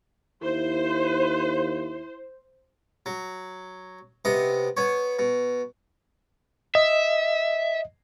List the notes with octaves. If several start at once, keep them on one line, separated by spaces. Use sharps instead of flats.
D#2 E4 C5
F#3
C3 B3 D#5
B3 C#5
B2
D#5 E5